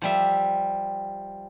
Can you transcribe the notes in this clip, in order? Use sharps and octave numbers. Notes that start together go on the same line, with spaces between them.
F3 G3 E5